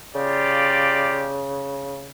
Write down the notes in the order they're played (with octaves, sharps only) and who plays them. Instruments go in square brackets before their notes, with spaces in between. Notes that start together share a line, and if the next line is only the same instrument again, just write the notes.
[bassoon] C#3 [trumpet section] F4 G4 D5